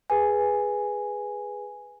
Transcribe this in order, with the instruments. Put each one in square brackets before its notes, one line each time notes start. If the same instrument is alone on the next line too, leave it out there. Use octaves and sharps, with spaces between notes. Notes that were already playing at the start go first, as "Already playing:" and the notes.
[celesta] G#4 B4 G#5